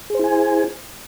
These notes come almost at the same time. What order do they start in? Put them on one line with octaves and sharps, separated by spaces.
G#4 C5 E4 G#5